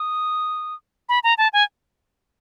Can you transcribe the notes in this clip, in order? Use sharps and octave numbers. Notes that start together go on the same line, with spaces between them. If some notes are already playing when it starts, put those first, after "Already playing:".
Already playing: D#6
B5
A#5
A5
G#5